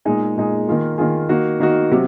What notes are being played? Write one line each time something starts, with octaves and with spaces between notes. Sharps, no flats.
A#2 G#3 D#4 G#4
A#2 G#3 D#4 G#4
D#3 A#3 F4 G#4
D#3 A#3 F4 G#4
D#3 A#3 D#4 F#4
D#3 A#3 D#4 F#4
C3 F#3